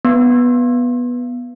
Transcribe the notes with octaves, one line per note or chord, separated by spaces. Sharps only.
B3